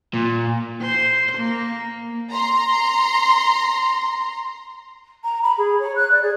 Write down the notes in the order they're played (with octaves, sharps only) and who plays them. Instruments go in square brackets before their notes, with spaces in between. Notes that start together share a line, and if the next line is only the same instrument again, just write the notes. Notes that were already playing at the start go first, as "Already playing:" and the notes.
[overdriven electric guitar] A#2
[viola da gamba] C5
A#3
[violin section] A#5 C6
[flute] A#5
B5
G#4
C#5
F#6
D5
G#4